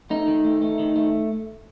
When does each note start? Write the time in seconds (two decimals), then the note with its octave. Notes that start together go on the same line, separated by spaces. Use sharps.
0.10 A3 D#4
0.28 D#3
0.45 A3
0.62 A3
0.79 D#3
0.96 A3